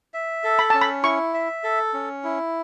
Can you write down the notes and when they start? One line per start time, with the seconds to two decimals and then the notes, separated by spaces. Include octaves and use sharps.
0.14 E5
0.44 A4
0.59 B5
0.70 C#4 A5
0.81 B5
1.03 E4 C#6
1.34 E5
1.64 A4
1.94 C#4
2.24 E4